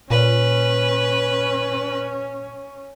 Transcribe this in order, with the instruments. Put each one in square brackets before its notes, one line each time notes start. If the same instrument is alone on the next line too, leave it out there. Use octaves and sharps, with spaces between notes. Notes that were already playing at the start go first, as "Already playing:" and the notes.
[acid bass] A#2 [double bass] C#4 [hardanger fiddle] B4